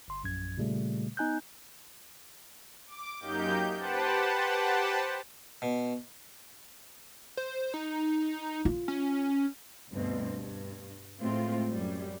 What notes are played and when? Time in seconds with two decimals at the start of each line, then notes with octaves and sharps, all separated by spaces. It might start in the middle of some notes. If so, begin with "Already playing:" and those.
0.08 G1 C6
0.23 A#1 F#2 G#6
0.58 A#2 C#3 G3 A3
1.17 B3 D#4 G#5 F#6 G6
2.87 D6
3.20 F#2 A#3 D#4 G4 G6
3.77 G4 B4 C5 F#5 G5 A5
5.62 B2
7.37 C5
7.74 D#4
8.65 F4
8.88 C#4
9.91 D2 G2 B2 C4
10.36 G2
11.19 A2 G#3 A3 C4 F4
11.70 F#2 G3